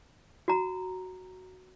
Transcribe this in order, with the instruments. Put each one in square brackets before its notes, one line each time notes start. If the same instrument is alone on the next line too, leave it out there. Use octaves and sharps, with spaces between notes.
[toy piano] F#4 A#5